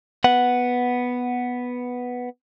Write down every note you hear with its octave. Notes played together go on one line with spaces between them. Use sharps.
B3 F#5